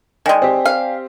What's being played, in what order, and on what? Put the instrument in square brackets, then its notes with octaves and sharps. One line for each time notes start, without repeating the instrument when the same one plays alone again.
[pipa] D#3 G#3 [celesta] D5 G5 G#5
[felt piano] C4 G4
[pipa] F5